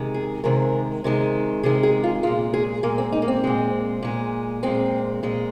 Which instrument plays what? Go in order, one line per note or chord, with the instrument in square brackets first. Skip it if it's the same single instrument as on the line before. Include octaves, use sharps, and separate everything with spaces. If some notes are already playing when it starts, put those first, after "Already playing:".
Already playing: [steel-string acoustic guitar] C3 D#3 G#3
G#4
C3 D#3 G#3 A#4
C3 D#3 G#3
C3 D#3 G#3 G#4
G#4
F4
A#2 G#3 F4
G#4
A#2 G#3 A#3
C4
D#4
A#3
C4
A#2 G#3
A#2 G#3
A#2 G#3 C4
A#2 G#3